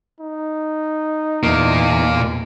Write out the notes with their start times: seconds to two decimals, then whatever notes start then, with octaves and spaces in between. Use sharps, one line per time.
0.20 D#4
1.43 E2 A#2 A#3